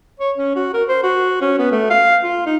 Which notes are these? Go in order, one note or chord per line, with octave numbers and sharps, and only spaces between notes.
C#5
C#4
F#4
A#4
C5
F#4
C#4
B3
A3
F5
F4
D#4